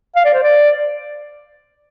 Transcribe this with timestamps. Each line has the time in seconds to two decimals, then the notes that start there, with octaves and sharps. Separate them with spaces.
0.16 F5
0.25 D5
0.34 C5
0.43 D5